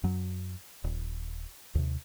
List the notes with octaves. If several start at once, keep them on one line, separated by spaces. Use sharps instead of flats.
F#2 F#3
D#1
D#2 C3